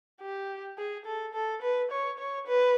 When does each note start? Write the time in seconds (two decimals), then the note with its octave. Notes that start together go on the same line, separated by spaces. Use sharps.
0.21 G4
0.78 G#4
1.05 A4
1.34 A4
1.62 B4
1.91 C#5
2.19 C#5
2.47 B4